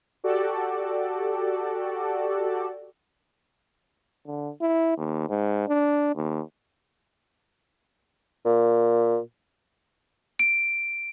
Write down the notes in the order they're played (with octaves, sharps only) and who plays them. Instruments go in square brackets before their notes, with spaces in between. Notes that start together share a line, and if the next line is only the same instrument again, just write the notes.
[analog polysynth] F#4 G4 A4 D5
[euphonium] D3
E4
D#2
G#2
D4
D#2
[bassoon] A#2
[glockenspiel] D7